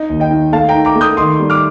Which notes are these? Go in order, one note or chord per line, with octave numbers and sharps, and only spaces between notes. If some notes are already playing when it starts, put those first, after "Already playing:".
Already playing: D#4 D#5
D#2
D#5 G5
D#3
A3 F5 A5
G5 A#5
D#4
A#5 D6
A3
D#6 G6
D#3 C6 D#6
G3
D6 F6